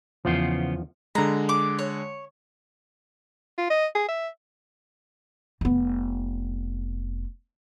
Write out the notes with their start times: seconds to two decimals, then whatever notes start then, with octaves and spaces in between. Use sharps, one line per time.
0.25 E2 C#3 F3 B3 C5
1.15 D3 G#3 A#5
1.49 D6
1.79 C#5
3.58 F4
3.70 D#5
3.95 G#4
4.09 E5
5.61 F1 B3